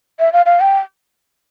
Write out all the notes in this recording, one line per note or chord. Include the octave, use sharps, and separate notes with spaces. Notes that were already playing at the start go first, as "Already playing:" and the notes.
E5
F5
F5
G5